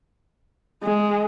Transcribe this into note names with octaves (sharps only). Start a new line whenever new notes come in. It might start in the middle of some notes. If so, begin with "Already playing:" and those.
G#3